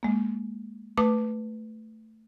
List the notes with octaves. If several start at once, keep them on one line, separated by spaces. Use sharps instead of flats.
G#3 A#3
A3 B4 D6 D#6